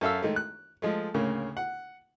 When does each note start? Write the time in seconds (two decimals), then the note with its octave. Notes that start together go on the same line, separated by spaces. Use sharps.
0.01 F#2 A4 E5 F5 E6
0.22 D#3 G#3 A3
0.36 F#6
0.82 F3 G#3 A3
1.14 D2 A2 C#3 A#3
1.57 F#5